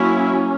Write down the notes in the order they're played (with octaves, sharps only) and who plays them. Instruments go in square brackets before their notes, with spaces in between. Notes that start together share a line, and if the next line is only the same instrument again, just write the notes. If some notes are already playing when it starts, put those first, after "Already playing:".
Already playing: [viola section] F#3 A#3 C#4 E4